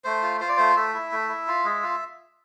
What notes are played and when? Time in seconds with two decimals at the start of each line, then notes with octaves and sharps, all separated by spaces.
0.04 A3 C5
0.22 F4
0.40 F4 C5
0.49 D5
0.57 A3 C5
0.76 A3 E5
0.94 E4
1.12 A3
1.29 E4
1.48 F4
1.65 G#3
1.83 F4